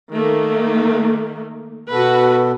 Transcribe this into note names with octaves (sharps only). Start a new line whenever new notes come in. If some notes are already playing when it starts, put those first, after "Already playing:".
D#3 A3 A#3
B2 B3 F#4 A4 B4